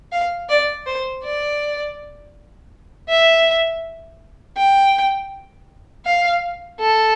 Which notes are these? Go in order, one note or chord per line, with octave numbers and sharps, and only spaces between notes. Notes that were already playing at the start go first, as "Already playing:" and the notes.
F5
D5
C5
D5
E5
G5
F5
A4